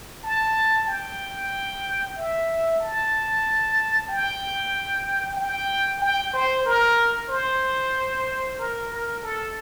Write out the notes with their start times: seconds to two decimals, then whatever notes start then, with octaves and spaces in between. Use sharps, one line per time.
0.24 A5
0.87 G5
2.16 E5
2.80 A5
4.08 G5
5.37 G5
6.02 G5
6.33 C5
6.65 A#4
7.29 C5
8.58 A#4
8.91 A#4
9.23 A4